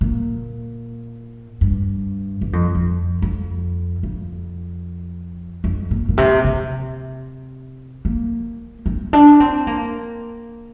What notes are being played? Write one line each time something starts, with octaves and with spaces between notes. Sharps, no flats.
A#2
G2
G2
F2
F2
F2
F2
F2
A#2
A#2
C3
C3
A#3
C4
D4
C4
A#3